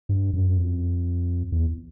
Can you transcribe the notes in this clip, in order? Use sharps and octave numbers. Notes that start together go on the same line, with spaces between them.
G2
F#2
F2
E2